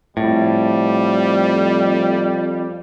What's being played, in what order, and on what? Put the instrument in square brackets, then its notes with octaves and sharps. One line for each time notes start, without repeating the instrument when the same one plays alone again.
[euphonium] F2 [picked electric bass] A2 [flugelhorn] G3